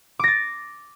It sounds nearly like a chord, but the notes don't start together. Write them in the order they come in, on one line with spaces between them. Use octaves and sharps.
D6 A#6 A6